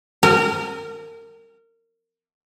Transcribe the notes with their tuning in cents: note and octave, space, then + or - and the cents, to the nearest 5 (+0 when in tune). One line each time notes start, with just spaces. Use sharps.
A#4 -25